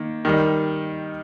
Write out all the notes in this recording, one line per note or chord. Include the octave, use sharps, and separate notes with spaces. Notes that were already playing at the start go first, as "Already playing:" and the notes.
Already playing: D#3 A#3
D#3 G3 D#4